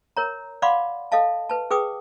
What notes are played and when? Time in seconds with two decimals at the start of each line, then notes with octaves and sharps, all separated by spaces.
0.17 A#4 C#5 A#5
0.62 D5 F5 F#5 B5 C6 D6
1.12 A4 D#5 F5 A5
1.50 B4 A5
1.71 G#4 B4 G5 D6 D#6